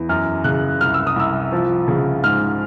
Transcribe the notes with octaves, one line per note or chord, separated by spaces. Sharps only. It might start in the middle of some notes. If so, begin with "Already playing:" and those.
Already playing: E2
F#2 F6
C#3 F#6
C2 F6
E6
D#6
C2 E6
F3
C#3
G#2 F6